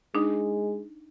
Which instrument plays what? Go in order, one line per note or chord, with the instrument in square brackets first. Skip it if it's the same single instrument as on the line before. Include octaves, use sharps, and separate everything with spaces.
[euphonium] G#3 [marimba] D4 D#4